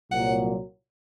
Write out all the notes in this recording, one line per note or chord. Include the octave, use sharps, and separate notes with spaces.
C2 A#2 F#3 F#5